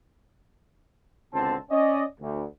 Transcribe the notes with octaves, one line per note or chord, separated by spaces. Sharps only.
C#2 B2 D3 C4 A5
C#4 D5 D#5
D2